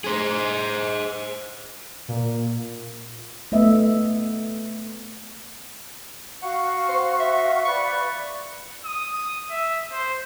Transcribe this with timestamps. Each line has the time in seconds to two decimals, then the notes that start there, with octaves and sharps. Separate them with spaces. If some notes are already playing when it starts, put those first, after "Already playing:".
0.04 G#4 C5
2.08 A#2
3.52 A3 B3 D#5 E5
6.43 F#4 F5 F#5 C#6
6.89 C5
7.19 E5
7.65 B4 D5 B5 C#6
8.85 D#6
9.51 E5
9.92 C5